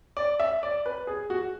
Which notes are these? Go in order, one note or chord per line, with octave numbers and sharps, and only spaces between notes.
D5
E5
D5
B4
G#4
F#4